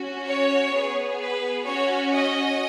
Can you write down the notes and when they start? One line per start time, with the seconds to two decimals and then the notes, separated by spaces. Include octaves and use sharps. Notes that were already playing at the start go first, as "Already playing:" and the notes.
Already playing: C#4 F#4
0.27 C#5
0.73 B3 G#4
1.20 B4
1.66 C#4 F#4 C#5
2.13 D#5